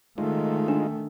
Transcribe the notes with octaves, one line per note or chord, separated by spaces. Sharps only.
D#3 G#3 A3 D#4 F4
D4